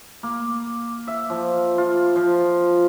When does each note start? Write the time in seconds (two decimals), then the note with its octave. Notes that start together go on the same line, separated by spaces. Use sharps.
0.23 A#3
1.07 E5
1.30 F3
1.78 F4
2.16 F3